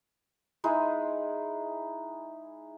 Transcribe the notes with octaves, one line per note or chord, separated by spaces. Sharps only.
G#3 D#4 E4 G#4